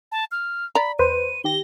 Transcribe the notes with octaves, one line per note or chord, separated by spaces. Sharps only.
A5
F6
D5 A#5 B5
E2 B4 C5 D#7
D#3 G4 A#6 G7